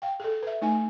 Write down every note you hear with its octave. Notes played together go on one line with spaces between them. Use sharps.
F5 G5
G#4 A4
B4 E5
A3 D#4 G#5